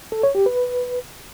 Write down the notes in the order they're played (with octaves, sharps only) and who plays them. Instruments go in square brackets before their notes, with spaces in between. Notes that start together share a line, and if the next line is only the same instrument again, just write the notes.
[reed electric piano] A4
C#5
G4
B4